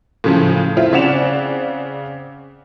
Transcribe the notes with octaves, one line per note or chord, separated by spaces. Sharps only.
A2 C#3 F3
C4 E4 F4
C#3 C4 D5 F#5 E7 F7